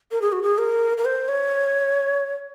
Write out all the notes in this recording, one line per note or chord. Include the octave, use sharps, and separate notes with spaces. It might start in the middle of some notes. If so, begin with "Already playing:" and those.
A#4
G#4
F#4
G#4
A#4
A#4
C5
C#5